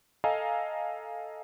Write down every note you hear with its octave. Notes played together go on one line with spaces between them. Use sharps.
A4 D#5 F5 G#5 A#5